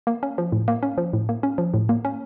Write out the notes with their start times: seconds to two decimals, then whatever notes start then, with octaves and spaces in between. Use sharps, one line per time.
0.07 A#3
0.23 C#4
0.38 F3
0.52 A2
0.68 A#3
0.83 C#4
0.98 F3
1.13 A2
1.29 A#3
1.43 C#4
1.58 F3
1.74 A2
1.89 A#3
2.05 C#4